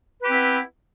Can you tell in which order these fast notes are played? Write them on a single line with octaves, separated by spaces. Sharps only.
B4 G4 C4 E4 B3